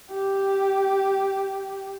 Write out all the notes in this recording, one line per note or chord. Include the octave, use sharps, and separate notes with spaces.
G4